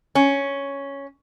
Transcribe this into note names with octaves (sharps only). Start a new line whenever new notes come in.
C#4